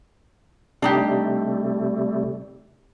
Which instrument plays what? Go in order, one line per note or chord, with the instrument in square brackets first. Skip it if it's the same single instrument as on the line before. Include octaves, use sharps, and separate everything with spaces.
[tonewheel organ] C3 G3 A3 [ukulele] D4 D#4 G4